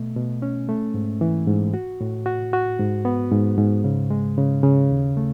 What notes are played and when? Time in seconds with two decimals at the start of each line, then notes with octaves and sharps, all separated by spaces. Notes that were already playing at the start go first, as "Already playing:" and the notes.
Already playing: B2 A3
0.16 B2
0.42 C#4
0.69 A3
0.94 G#2
1.21 E3
1.48 G#2
1.74 F#4
2.01 A2
2.26 F#4
2.53 F#4
2.80 G#2
3.05 B3
3.32 G#2
3.58 G#2
3.84 C#3
4.10 G#3
4.38 C#3
4.63 C#3
4.90 D#2
5.17 A3